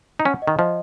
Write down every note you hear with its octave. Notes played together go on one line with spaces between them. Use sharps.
D#4
C#4 F#5
D#5
D#3
F3 D#5